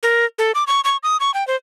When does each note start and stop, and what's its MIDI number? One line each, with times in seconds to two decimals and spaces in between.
0.03 0.25 70
0.38 0.52 69
0.55 0.64 86
0.67 0.81 85
0.84 0.97 85
1.03 1.17 87
1.20 1.33 85
1.34 1.46 79
1.47 1.56 72